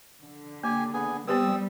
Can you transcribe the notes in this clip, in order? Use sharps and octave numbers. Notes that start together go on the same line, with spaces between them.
D3
A#3 G4 G#5
B3 G#4 G#5
G3 B3 C4 G4 B4 D#6 E6